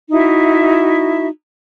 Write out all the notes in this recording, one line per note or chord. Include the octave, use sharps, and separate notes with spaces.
D#4 E4 F#4 E5